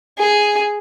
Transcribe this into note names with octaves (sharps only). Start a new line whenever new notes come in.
G#4